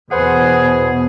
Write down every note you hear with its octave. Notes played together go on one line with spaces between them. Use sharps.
E2 B2 G#4 B4 C5 F#5